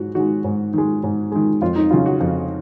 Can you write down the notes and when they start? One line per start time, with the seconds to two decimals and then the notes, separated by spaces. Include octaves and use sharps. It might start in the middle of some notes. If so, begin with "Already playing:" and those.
Already playing: G#2 G#3 F#4
0.15 D#3 G#3 F#4
0.44 G#2
0.74 D#3 G#3
1.03 G#2
1.32 D#3 G#3
1.62 F2 F4
1.76 D#4
1.91 C#3 F#3 F4
2.06 F#4
2.21 F2